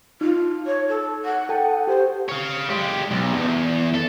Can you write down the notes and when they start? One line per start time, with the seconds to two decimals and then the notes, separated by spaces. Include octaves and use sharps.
0.21 D#4 F4
0.65 C#5
0.88 A4
1.24 F#5
1.49 A4 G5 A5
1.87 G4 C5
2.29 C#5 F5
2.69 G#3 G4
3.11 B1
3.34 E2
3.95 A4